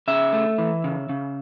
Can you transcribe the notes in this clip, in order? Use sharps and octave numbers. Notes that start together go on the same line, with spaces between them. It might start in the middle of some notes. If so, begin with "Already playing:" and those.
C#3 E5
A3
E3
C#3
C#3